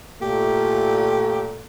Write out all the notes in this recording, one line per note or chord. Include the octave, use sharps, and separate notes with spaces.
A#2 A3 G4